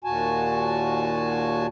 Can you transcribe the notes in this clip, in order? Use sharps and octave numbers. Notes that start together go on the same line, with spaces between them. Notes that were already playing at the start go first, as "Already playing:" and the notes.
D#2 A#2 F#4 G#5 A5